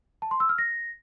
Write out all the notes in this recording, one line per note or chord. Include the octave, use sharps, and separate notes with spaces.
A5
C6
E6
F6
A#6